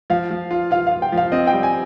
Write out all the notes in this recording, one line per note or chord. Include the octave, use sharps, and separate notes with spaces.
F3 F5
F3
F4
F4 F5
F4 F5
G5
F3
F5
C4 D#5
G5
G3
G#5